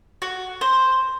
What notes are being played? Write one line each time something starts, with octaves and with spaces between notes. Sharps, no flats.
F#4
C5